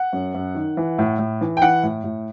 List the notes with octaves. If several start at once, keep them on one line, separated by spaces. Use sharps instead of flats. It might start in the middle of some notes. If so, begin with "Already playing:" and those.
Already playing: F#5
F#2
F#2
D#3
E3
A2
A2
E3
G5
E3 F#5
A2
A2